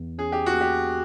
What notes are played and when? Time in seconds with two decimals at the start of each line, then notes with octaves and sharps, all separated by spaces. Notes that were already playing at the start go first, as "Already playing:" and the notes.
Already playing: E2
0.18 C#4 G#4
0.32 G4
0.46 F#4
0.54 A#3
0.61 G4
0.90 F#4